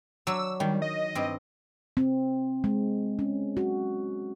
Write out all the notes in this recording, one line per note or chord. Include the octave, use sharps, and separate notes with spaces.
F#3 D4 E6
D#3 G3
D#5
G2 C4
C4
G#3
C#4
F#4